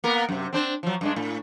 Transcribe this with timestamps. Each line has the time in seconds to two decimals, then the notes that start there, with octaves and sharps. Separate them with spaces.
0.04 A#3 B3 A#4
0.29 F#2 C3
0.53 C4 D4 C5
0.83 F3 F#3
1.01 G2 G#3 D4
1.16 A2